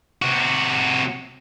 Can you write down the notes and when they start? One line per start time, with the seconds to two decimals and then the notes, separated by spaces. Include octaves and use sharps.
0.22 C3 F#4